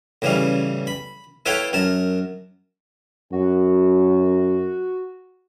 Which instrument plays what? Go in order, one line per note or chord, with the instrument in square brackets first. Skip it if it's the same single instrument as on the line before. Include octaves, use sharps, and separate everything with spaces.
[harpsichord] A1 C#3 E3 G3 F5
B5
E4 A4 B4 C#5 F5 G5
F#2 A#4 A5
[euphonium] F#2 [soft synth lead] F#4